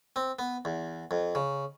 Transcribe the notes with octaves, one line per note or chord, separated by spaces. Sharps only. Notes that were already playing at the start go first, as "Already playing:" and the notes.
C4
B3
E2
F2
C#3